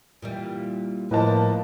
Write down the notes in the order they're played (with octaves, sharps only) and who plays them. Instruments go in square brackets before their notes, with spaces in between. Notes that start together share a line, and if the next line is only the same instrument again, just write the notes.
[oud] A#2 E3 G3
[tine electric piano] A2 [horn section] F3 A#3 [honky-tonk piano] B4 D#5 A5